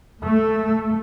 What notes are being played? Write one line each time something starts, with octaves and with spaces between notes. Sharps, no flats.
A3